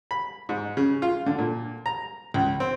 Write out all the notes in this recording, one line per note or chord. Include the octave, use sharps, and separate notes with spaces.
B5
G#2
C#3
F4
D3
A#2
A#5
C#2
C4